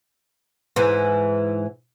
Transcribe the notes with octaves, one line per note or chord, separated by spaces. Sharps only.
G#2 E3